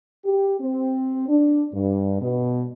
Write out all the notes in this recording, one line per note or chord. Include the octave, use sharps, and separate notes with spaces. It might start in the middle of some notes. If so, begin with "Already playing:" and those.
G4
C4
D4
G2
B2